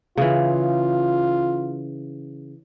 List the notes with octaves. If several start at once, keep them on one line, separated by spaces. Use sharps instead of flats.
C#3 E3 F4